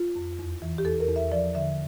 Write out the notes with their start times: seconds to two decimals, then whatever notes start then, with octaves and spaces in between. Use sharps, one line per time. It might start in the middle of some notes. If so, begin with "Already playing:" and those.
Already playing: F4
0.16 F2
0.39 E2
0.62 E3
0.78 G4
0.85 E2 A4
1.00 A#4
1.08 E2
1.16 E5
1.32 F3 D5
1.55 D3 E5